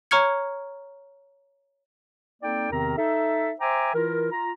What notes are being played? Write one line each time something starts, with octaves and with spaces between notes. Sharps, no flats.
C#5 A#5 C#6 F6 G#6 C#7
A#3 C4 D#4 A4 D5 G5
E2 C3 D#3 C4 A#4 A#5
D#4 A4 E5
C5 E5 G5 G#5 A#5 D6
E3 E4 F4 A#4
F4 A#5